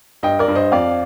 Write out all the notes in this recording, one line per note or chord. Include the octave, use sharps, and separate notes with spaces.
G2 D#5 G5
A#4 D5
G2
C5 D#5
F2 D5 F5